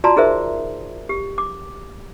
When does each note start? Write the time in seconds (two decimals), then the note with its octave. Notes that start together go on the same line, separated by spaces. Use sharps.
0.04 F4 F#4 D5 A5 A#5 C6
0.16 D#4 G#4 A#4 C5 E5
1.09 G4
1.38 D6